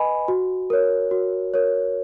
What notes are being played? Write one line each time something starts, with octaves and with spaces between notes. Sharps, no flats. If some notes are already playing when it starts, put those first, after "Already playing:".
Already playing: B4 D#5 G#5 B5
F#4
A#4 C#5
F#4
A#4 C#5